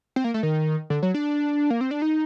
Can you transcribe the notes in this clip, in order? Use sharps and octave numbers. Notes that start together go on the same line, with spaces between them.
C4
A#3
A3
D#3
D3
F#3
D4
A#3
C4
D4
D#4